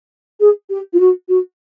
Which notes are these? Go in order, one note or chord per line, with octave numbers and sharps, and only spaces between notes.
G#4
G4
F4
F#4
F#4